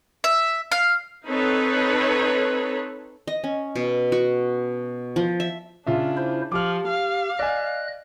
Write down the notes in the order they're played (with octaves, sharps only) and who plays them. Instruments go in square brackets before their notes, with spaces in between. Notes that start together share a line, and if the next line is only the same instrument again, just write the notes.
[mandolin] E5
F5
[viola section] C4 D#4 A4 B4 C#5
[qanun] D#5
C#4
B2
F#4
F3
E5
[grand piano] C#3 F4 E5 [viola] D4
[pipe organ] E4 C5
[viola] F3 [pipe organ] G4 [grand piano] D6 F6
[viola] F5
[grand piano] D5 G#5 [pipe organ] D#5 F#6